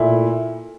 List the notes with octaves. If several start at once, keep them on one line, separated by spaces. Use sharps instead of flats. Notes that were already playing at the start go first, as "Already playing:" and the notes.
Already playing: A#2 A3 E4